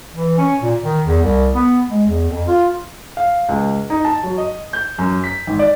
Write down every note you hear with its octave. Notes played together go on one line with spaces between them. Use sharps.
E3
C#4
A#2
D#3
E2
C2
B3
G#3
E2
F2
F4
F5
C#2
D#4
A5
F#3
D#5
G6
F#2
B6
G#1
D5